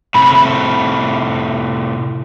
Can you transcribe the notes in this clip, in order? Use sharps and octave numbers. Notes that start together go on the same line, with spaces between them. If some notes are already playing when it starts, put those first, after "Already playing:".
A2 C3 B5